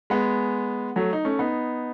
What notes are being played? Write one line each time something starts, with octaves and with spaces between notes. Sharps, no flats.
G#3 B3
F#3 A3
D#4
A3 C#4
B3 D#4